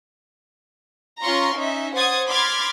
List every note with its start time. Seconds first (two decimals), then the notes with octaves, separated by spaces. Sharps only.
1.22 C#4 F4 A#5 C6 C#6 F6
1.53 C#4 D#4 E5
1.94 C5 F#5 D#6 G#6 A6
2.29 B5 C6 D6 F6 G#6 A6